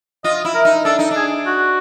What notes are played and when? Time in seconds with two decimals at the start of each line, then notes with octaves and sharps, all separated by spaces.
0.24 F4 D#5
0.45 E4
0.54 A#4
0.65 D#4
0.85 D4 A4
0.99 D#4
1.11 D4
1.16 G#4
1.46 F#4